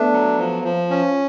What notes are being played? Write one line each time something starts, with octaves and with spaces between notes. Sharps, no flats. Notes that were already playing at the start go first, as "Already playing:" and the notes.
Already playing: A3 B3 D4
F#3
F3
F3
C#4